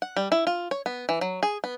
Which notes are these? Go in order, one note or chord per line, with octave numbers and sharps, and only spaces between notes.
F#5
G3
E4
F4
C#5
B3
E3
F#3
G#4
B3